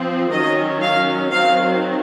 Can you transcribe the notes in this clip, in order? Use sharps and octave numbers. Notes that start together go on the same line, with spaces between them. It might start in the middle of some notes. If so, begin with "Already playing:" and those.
Already playing: F3 C4
D#3 F#3 C#4 D#5
F5
D#3 F#3 C4 F5